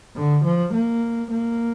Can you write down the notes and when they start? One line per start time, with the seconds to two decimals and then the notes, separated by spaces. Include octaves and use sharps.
0.16 D3
0.44 F3
0.74 A#3
1.31 A#3